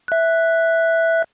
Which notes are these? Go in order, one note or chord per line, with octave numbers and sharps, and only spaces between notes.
E5 F#6